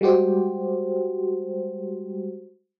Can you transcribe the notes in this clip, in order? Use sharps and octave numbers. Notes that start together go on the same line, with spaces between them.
G3 G#3 F#4 G4 C5